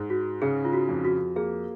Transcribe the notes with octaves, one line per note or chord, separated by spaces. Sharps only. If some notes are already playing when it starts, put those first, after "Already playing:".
Already playing: G#2 G#4
F#4
C#3 G#4
F4
F#4
F2
F#4
A#3 G#4